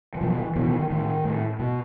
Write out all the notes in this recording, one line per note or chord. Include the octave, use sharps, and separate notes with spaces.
E3
B2 F3
E3
B2 E3
D#3
D#3
A2 D#3
A2
B2